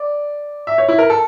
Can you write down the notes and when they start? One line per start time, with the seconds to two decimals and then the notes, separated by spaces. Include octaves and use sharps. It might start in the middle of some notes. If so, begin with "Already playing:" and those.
Already playing: D5
0.67 E5
0.78 C#5
0.88 E4
0.98 A#4
1.10 A4